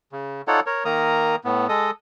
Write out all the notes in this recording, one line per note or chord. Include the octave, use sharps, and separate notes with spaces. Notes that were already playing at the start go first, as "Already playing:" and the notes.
C#3
D#4 F4 A4 C#5 D5 F#5
A#4 C#5
D#3 A#3 A#4 A#5 D#6
A2 B3
G#3 A4 D#5 D#6